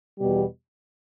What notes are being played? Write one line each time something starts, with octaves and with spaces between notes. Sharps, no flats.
E2 B2 G3